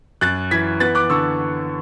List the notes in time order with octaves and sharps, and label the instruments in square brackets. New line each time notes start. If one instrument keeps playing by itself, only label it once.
[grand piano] F#2 F#6 A6
E3 G#6 B6
B3 F#6 A6
D6 F#6
D3 C#6 E6